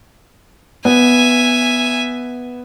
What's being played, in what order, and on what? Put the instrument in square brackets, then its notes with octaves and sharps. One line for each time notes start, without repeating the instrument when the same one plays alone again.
[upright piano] B3 [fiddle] E5 G#5